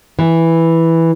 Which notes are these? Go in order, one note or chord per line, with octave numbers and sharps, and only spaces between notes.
E3